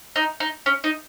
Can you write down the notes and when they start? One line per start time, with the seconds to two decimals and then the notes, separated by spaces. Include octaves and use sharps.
0.16 D#4
0.40 D#4
0.66 C#4
0.84 D#4